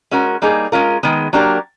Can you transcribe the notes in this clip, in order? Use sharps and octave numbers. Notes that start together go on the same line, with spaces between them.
G#3 C#4 F#4 A#4
G3 A#3 D#4 G#4
G#3 C#4 F4 A#4
D#3 G#3 B3
F#3 A#3 D4 G4 A#4